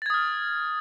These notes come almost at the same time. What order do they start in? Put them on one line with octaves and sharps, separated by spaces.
A6 G#6 D#6 F6